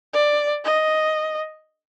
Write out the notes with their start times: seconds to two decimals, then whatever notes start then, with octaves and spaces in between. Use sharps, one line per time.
0.13 D5
0.65 D#5